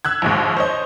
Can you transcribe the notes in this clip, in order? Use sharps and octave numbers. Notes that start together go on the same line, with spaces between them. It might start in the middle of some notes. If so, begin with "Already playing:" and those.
E6 F#6 G#6
A#1 D#2 G#2
C5 C#5 D#5